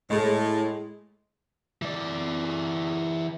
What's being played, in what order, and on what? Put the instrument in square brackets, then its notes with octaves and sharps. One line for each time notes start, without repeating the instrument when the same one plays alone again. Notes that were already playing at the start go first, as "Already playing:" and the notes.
[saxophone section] A2 [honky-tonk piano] G#3 G#4
[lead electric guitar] E3 D5